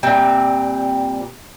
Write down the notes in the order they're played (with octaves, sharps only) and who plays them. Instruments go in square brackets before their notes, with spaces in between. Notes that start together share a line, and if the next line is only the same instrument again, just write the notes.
[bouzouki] A#2 G3 C4 E5